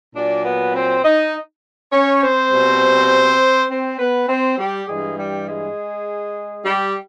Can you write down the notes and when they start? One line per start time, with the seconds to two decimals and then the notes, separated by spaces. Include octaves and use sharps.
0.16 A#2 F#3 D4 D5
0.45 B3 B4
0.75 C4 C5
1.04 D#4 D#5
1.92 C#4 C#5
2.22 C4 C5
2.51 B2 G3
3.69 C4 C5
3.99 B3 B4
4.28 C4 C5
4.58 G3 G4
4.87 G2 E3 G3 G#3 G#4
5.17 G3 G4
5.46 G#3 G#4
6.64 G3 G4